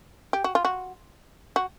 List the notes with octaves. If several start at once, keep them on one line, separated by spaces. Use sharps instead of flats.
G4
F#4
F4
F#4
F#4